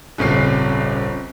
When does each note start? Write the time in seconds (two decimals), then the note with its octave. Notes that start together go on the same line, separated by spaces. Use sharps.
0.18 D#1 G#1 C#3 C#4 C7